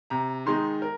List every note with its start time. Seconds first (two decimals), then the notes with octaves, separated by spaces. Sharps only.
0.10 C3 A#5
0.46 D#3 G#3 D#4 C6
0.82 A#4